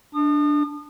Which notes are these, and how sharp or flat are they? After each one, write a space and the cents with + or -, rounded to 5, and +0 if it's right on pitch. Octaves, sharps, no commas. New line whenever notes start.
D4 +0 D#6 -35